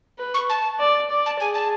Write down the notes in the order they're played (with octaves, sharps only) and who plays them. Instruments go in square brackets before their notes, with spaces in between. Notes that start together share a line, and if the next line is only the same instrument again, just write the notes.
[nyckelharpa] B4
[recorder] C#6
A5
[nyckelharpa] D5
D5
[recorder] A5
[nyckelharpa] G#4 [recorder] G#5
[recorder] A5